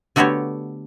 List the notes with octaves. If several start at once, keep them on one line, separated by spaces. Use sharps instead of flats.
D3 A3 B3 F#4 G4 C#5